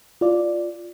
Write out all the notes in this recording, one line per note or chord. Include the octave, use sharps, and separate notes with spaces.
F4 D5